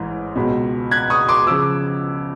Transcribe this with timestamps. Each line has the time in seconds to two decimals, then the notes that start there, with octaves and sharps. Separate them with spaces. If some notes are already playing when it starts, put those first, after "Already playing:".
Already playing: A1 G#2 E3
0.35 C#2 B2
0.91 F#6 G#6
1.10 C#6 D#6
1.28 C6 D6
1.47 C#3 F3 D6 E6